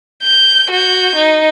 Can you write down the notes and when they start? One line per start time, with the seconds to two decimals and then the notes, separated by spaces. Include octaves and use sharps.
0.23 G6
0.71 F#4 G6
1.16 D#4